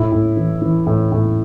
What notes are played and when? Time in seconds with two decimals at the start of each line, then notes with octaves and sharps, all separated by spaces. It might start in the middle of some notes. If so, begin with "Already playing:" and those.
Already playing: A2 E4
0.12 A2
0.37 E3
0.62 E3
0.87 A2
1.12 A2